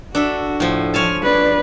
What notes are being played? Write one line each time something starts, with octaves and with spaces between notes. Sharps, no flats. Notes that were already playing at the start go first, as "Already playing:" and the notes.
D4 F#4 A4 E5
A2 F3
F3 C#5 G#5 A5 F6
D4 B4 D5